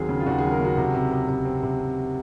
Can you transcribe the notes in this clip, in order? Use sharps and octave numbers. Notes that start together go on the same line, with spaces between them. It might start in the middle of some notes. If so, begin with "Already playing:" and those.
Already playing: D#2 F#3 C4 G#4
C#3
F4
D#2 F#4
G#4
F#3
A#4
C#3 F#4
C3
C3
C3
C3
C4
C3